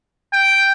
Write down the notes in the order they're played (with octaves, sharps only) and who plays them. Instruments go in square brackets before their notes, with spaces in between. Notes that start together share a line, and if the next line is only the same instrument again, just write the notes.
[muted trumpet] G5